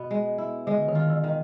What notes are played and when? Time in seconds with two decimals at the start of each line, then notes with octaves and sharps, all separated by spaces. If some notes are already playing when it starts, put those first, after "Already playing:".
Already playing: B2 B3
0.11 G#3
0.38 E4
0.67 D3 G#3
0.88 D#3
0.95 F4
1.10 E3
1.24 D#3